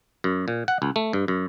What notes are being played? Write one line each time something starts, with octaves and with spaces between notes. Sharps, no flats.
F#2
A#2
F#5
C#2
A3
G2
F#2